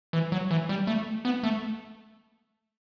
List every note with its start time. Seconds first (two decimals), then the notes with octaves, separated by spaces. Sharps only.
0.13 E3
0.32 F#3
0.51 E3
0.69 G3
0.87 A3
1.25 B3
1.43 A3